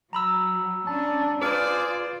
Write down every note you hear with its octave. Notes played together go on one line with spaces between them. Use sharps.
F#3 A#5 B5 E6
C#4 D4 A5
F4 G#4 B4 C5 D5 F6